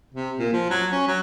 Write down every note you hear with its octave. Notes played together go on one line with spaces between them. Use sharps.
C3
A#2
F3
F#3
C#4
F#3